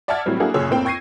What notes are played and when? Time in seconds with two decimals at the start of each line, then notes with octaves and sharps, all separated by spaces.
0.08 D5 E5 F#5 A5 F6 G#6
0.26 A2 E3 F#3 G3 C4
0.40 A#3 D4 E4 F#4 G#4 A4
0.54 F#1 F#2 A#2 G#4 C#5 E6
0.69 F2 A2 A#3 C4 G5
0.85 G5 C#6 G#6 A#6 C7 D#7